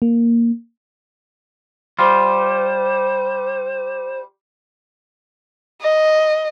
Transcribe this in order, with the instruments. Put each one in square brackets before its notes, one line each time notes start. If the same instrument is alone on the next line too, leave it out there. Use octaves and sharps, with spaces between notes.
[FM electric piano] A#3
[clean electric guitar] G3 F4 [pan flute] C5
[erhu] D#5